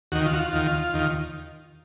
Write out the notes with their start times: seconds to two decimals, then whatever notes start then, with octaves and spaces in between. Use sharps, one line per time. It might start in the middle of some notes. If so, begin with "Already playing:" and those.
0.12 D#2 D#3 F#4
0.26 F4
0.33 F#4
0.39 F4
0.53 D#2 D#3
0.94 D#2 D#3